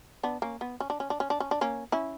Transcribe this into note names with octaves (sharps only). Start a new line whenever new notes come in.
B3 D4
A#3 C#4
B3
C#4
D4
C#4
D4
C#4
D4
C#4
D4
A#3 C#4
C#4 E4